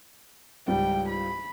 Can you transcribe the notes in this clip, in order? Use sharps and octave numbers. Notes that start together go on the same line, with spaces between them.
C#2 G#2 G3 G5
B5